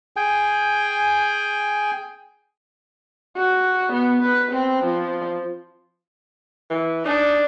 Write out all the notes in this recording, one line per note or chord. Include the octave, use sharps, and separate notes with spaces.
G#4 G5 G#5
F#4
B3
B4
C4
F3
E3
D4 D#4